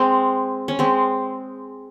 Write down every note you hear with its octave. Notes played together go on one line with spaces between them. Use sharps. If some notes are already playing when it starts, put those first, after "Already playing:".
Already playing: G#3 C4
C#4
G#3 C4